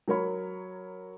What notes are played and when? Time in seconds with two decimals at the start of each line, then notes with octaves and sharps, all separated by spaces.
0.08 F#3 A#4 C#5 B5